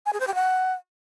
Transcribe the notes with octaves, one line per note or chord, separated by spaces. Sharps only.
G#5
G#4
C5
G4
F#5